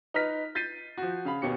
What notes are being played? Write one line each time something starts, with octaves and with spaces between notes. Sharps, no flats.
D#4 B4 F6 B6
G6 A6 B6 C7 D#7
F3 F#4
C#3 F5 B5
D#2 B2 C#4 G4 C#7